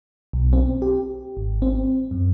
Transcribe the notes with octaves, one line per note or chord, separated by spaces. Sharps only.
B1
C4
G4
G#1
C4
F#2